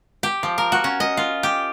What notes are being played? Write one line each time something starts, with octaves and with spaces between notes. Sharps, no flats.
G4
F3
A#4
F#4
C#4
D#5
F4
G4